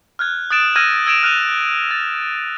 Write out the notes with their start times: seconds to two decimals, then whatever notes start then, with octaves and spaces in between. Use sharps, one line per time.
0.19 F6 F#6 G#6
0.51 D#6 F#6 A6 D7 E7
0.76 E6 F6 G6 G#6 A#6 D#7
1.07 E6 G#6 D7 E7 F7
1.23 F6 F#6 D#7 F7
1.91 A6